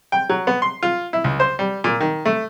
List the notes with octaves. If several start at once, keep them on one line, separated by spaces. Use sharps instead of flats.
G5
F#3
B3
C6
F4
E4
C#2
C5
G3
A#2
D#3
A3